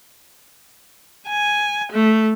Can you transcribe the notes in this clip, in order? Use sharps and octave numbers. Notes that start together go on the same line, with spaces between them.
G#5
A3